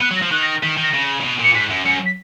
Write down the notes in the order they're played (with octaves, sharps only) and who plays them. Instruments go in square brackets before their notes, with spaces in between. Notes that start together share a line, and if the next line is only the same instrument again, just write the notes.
[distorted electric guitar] B3 [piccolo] F#6
[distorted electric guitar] F#3
[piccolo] A#6
[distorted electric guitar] F3
[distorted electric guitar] D#3 [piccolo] F#6
[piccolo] A#6
A#6
[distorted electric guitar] D#3 [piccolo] B6
[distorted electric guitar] D#3
[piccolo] A#6
[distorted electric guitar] C#3
C#3
B2
[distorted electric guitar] A#2 [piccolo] C#7
[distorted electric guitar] G#2 [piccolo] B6
[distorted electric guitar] F#2
[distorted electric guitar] F#2 [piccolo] C#7
[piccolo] B6